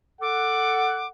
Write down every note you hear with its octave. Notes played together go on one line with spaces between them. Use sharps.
A4 F#5 D6